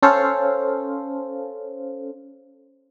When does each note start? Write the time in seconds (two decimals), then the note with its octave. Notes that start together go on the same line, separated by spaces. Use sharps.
0.03 C#4 A4 C5 F5